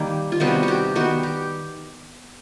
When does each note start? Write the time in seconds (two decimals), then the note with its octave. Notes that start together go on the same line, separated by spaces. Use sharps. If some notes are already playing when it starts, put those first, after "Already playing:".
Already playing: D#3 G3 A#3 G4
0.32 F4
0.40 C3 D#3 G3 B3 F#4
0.63 F#4
0.68 G4
0.95 D#3 G3 B3 F#4
1.23 G4